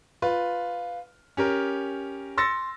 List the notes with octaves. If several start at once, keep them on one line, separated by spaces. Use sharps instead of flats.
F4 B4
C#4 G4 A#4
C6 E6 A6 A#6 C#7